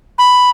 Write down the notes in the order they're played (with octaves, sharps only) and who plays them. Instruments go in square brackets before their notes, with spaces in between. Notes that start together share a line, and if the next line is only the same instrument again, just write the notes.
[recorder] B5